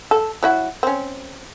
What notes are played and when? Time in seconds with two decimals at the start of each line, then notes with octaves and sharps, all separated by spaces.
0.11 A4
0.43 F#3 E4 F#4
0.83 C4 C#4